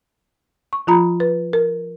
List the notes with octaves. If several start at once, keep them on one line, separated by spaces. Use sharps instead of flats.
C#6
F3 F4 A#5 B5
B4
A#4